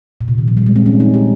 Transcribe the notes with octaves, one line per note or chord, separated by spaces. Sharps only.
A#2
C3
D#3
F3
G3
G#3
C4
C#4
D#4
G4